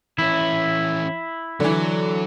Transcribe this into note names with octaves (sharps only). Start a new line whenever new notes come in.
E3 C#4 E4
D3 E3 F#3